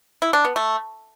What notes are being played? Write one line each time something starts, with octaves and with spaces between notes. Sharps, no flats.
E4
D4
B3
A3